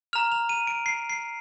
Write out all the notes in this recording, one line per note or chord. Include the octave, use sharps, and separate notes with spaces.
A#5 F6 F7
F7
D#7
D7
C7
C7